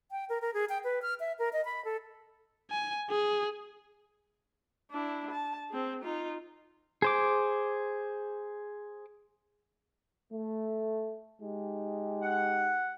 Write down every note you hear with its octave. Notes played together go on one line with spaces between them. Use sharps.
G5
A#4
A#4
G#4
G5
B4
F6
E5
A#4
D#5
B5
A4
G#5
G#4
D4 E4
A5
C4 G#4
D#4 F4
G#4 C5 D6
A3
G#3 D#4 G4
F#5